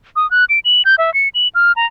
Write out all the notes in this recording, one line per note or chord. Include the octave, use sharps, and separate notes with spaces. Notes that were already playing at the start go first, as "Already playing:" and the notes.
D#6
F#6
D7
F#7
G6
E5
C#7
F#7
F6
A#5